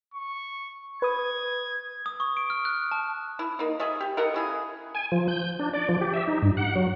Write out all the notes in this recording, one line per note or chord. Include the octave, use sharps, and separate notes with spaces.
C#6
B4 D#6 G#6
D#6
C#6
D7
F6
F#6
A5
E4
A#3 D#4
G#4 D#5 E5
G4
A4 A#4 D#5 F#5
C#3 E4 G#4
G#5
F3
G6
D4
D5
F3
G4
E5
D#4
G2
F#5
F#3